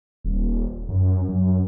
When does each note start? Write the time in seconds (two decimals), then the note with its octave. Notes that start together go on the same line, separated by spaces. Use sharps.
0.24 D#1
0.89 F#2
1.28 F#2